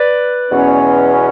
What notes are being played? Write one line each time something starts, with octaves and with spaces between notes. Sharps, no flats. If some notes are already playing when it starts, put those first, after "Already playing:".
Already playing: B4 D5
E2 B2 F#3 C#4